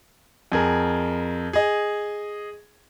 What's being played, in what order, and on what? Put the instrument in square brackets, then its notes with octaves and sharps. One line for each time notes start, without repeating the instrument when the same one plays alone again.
[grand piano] F2 G#4 A#4
G#4 D#5